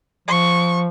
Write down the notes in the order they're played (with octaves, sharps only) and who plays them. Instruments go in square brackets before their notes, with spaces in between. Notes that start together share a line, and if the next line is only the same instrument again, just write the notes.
[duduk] F3 [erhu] C#6